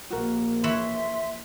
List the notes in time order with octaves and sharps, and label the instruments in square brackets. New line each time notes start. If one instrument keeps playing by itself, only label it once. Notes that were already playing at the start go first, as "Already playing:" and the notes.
[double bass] A#1 A#3 [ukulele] F#4 A#4
[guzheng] E3 E4 C#5 [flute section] E5 C6